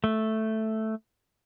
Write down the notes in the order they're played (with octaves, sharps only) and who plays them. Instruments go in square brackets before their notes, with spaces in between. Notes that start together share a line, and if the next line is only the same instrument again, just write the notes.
[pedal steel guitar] A3